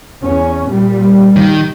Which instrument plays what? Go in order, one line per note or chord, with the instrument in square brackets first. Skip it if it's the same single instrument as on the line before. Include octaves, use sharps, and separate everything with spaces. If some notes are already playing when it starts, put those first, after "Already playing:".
[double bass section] E2 C#4
A#2 G3
[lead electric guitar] D#3